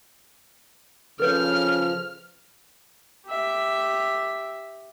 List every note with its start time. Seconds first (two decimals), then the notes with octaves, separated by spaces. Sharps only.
1.20 C#3 F3 A4 B4 C#5 F6
3.27 G4 E5